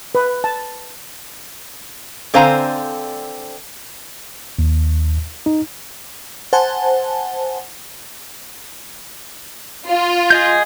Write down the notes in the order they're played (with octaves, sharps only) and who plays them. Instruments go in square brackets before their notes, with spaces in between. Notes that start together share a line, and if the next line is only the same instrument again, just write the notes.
[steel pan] B4
A5
[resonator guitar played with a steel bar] D3 C4 C5 F5 G#5 A#5
[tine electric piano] D#2
D#4
[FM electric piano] C5 F#5 G#5 A5
[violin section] F4
[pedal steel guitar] G#4 D#5 G6